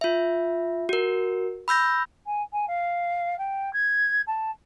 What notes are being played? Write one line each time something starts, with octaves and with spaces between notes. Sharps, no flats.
F4 E5
F#4 A#4
B5 E6 G6 A#6
G#5
G#5
F5
G5
G#6
A5